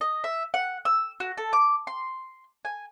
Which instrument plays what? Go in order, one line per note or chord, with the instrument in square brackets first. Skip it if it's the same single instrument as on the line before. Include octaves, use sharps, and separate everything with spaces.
[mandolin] D#5
E5
F#5
E6
F#4
A4
D6
C6
G#5